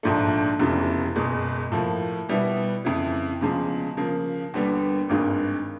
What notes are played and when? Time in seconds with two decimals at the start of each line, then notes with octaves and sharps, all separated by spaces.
0.03 A#1 G#2 F3 A3 D4
0.59 F1 E2 C#3 E3 A3
1.16 F#1 E2 B2 G#3
1.72 A2 F3 A#3
2.29 B2 G3 B3 E4
2.85 F2 C#3 E3
3.41 E2 C#3 F3 G#3
3.97 C#3 F3 A#3
4.54 D#2 D3 G3 B3
5.09 G#1 G2 D#3 G#3